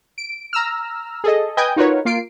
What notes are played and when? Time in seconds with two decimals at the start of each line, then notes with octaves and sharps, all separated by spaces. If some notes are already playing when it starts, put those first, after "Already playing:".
0.18 D7
0.53 A#5 E6 F6
1.24 G#4 A4 D#5
1.57 B4 D#5 G5 G#5 D#6 G6
1.76 D#4 F4 F#4 A#4 B4 C#5
2.05 A#3 F4 C7 D7